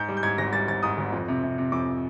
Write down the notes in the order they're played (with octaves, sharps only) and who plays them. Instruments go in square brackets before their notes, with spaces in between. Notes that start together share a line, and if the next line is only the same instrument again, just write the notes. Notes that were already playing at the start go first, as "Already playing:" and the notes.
Already playing: [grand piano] G#2 G6
G3
G6
G#2 G#6
G#1 A#6
G3 A6
G#1 A6
G#2 D#6
G#1
F2
C3
C3
C3
F2 D6